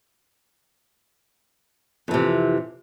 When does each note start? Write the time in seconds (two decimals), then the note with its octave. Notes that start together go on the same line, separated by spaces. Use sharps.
2.08 F2
2.11 E3
2.14 C3